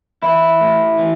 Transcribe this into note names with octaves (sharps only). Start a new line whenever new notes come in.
E3 E4
A2
E3